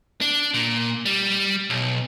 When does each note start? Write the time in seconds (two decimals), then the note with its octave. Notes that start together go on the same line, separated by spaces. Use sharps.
0.21 D4
0.54 A#2
1.06 G3
1.70 B1